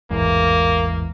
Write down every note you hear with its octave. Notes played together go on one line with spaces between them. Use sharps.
A1 E2 G#2 A#3